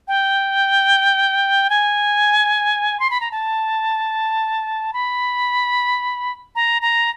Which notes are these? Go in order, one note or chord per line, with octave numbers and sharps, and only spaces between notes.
G5
G#5
C6
B5
A#5
A5
B5
A#5
A#5